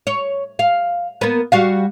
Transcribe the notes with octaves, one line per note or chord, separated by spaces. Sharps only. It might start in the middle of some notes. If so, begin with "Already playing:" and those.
C#5
F5
A#3 B3
G3 F#4 F5